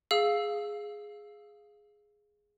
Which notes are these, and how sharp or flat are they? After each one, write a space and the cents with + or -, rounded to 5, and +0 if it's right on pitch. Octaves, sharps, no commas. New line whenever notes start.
G#4 +0 F5 +0 E6 +0